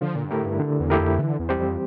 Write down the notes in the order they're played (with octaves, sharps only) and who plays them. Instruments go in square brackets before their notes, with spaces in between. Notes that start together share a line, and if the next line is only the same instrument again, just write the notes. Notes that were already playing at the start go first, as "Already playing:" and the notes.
[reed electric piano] D3 [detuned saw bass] F3
[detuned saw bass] A#2
G2
[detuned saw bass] A2 [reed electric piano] A3 E4 G4 A#4
[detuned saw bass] G2
[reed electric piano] D3
[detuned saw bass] E2
[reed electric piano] A3 E4 G4 A#4
[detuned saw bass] F2
[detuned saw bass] D3 [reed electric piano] E3
[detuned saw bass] E2
[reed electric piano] G3 C4 G4 C5
[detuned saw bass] F2